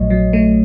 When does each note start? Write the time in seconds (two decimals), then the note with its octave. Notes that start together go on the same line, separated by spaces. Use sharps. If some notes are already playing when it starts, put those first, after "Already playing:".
Already playing: A#1 F#3 A3 C#5 D#5
0.10 F#3
0.33 A3